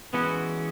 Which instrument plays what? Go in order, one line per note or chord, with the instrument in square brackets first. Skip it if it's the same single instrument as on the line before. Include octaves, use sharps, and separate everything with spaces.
[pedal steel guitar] E3 G#3 C#4 F#4 [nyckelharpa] B3